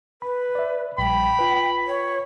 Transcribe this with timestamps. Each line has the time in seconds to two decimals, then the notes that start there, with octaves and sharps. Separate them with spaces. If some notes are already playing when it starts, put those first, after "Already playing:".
0.22 B4 B5
0.55 D5 E5
0.98 A#1 G3 G5 B5
1.39 F4 B4
1.87 C#5